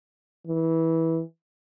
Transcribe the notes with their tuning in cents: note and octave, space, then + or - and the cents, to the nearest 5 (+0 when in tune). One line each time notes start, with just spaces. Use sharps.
E3 -15